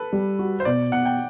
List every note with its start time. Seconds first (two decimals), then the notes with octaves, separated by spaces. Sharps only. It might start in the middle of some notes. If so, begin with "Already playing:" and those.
Already playing: A4 B4
0.13 G3
0.39 F#4
0.60 C5
0.65 B2 D5
0.92 B2 F#5
1.05 G5